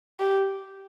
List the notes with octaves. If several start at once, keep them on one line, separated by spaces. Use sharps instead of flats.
G4